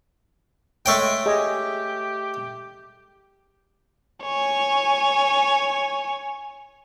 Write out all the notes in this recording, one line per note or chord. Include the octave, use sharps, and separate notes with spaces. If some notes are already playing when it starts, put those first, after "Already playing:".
G#3 A3 C#5 G5
G4 G#4 D#5 G#5
C#5 G#5